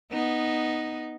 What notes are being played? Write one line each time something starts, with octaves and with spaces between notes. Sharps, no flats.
B3 D#4